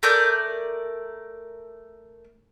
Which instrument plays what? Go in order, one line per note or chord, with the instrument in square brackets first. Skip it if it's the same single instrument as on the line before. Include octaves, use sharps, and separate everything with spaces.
[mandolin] A3 A#4 D5 G6